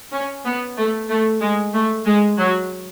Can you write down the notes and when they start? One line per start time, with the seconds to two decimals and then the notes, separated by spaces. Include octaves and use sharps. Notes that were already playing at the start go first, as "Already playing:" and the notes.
0.12 C#4
0.45 B3
0.77 A3
1.10 A3
1.41 G#3
1.73 A3
2.06 G#3
2.38 F#3